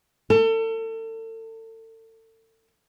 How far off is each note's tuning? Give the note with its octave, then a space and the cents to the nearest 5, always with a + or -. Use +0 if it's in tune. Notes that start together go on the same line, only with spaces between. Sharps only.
A4 +35